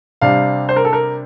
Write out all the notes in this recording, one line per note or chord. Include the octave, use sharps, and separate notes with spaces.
C3 G3 D4 F5
C5
A#4
A4
A#4